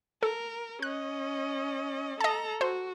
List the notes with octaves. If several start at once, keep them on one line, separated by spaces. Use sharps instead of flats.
A4 A#4
C#4 D#5 F#6
A4 D#5 A5 A#5
F#4 C5